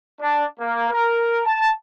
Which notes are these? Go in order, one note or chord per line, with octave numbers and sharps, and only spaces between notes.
D4
A#3
A#4
A5